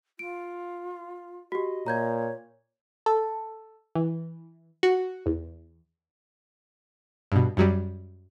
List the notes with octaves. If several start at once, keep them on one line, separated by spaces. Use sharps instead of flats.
F4 D7
F#4 G4 D#5
A#2 C#5 A#5 G6 G#6
A4
E3
F#4
E2
G2 B2
F#2 F#3 G3